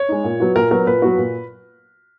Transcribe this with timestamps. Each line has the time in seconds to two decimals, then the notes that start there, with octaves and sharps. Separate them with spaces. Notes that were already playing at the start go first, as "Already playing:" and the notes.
Already playing: C#5
0.09 G#3 D#4
0.24 A#2
0.40 F#3 B3 F#4
0.55 A#2 A#4
0.71 F#3 B3 F#4 A#4
0.87 A#2 B4
1.02 F#3 B3 F#4
1.17 A#2